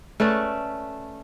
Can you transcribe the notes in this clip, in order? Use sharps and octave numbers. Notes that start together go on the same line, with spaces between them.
A3 C#4 B4 D5